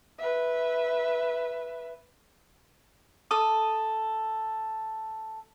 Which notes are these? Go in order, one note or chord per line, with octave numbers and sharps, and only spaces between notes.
B4 E5
A4 D#6